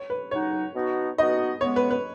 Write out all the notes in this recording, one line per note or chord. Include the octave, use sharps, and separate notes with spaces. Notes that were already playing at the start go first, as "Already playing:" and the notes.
Already playing: C#5
B4
C#3 F#3 D#4 F#4 C#5
B2 B3 D#4 F#4
B2 B3 D#4 F#4 D#5
C#3 G#3 B3 C#5
B4
B4